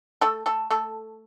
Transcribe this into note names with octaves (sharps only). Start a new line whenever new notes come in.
A3 A4
A3 A4
A3 A4